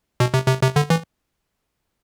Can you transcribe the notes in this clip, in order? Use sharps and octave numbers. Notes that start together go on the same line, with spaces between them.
B2
C3
C3
C3
D3
E3